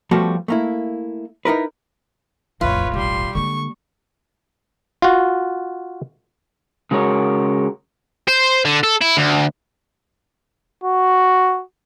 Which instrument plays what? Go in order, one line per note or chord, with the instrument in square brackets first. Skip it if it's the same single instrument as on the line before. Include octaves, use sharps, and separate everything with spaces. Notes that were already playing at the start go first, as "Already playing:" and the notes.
[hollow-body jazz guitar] F3 G3 A3 B3 F#4 A4
A3 A#3 E4
D#4 E4 A#4 B4
[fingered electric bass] D#1 A1 [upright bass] F2 A2 [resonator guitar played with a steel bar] F4 [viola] B4 C#5
[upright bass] B1 [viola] G3 C6
[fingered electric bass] D3 [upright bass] G#3 A#3 [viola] C#6
[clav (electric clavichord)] F4 F#4
[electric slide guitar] C#3 G#3 F#4 A#4 C#5
[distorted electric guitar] C5
D3
A4
E4
D2
[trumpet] F#4